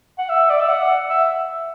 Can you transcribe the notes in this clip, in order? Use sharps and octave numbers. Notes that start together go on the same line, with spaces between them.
F#5
E5
D5
E5
F#5
E5